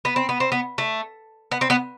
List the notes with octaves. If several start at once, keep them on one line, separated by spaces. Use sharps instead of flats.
B3
C4
B3
C4
B3
A3
B3
C4
B3